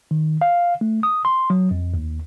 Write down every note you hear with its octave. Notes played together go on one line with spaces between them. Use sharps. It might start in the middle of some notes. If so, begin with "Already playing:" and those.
D#3
F5
A3
D#6
C6
F#3
F2
D#2